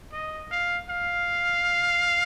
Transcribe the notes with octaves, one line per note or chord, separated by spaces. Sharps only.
D#5
F5
F5